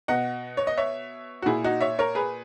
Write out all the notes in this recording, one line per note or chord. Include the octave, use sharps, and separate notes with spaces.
B2 D#5 F#5
C#5
D#5
C#5 E5
F#4
A#2 E4 G#4
D#4 F#4
C#5 E5
A#4 C#5
G#4 B4